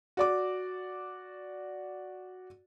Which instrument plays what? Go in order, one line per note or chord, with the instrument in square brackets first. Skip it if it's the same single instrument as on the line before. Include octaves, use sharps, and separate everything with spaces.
[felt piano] F#4 D5 D6